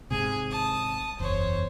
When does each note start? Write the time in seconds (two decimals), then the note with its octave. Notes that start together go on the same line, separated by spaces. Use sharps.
0.11 G#1 G#2 C3 G#4 G#5
0.51 A5 D#6
1.20 F#1 E2 C5 C#5